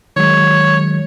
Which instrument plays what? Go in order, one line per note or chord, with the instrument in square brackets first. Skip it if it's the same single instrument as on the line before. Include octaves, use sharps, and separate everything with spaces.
[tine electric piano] D#3 F#3 G#3 [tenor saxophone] C#5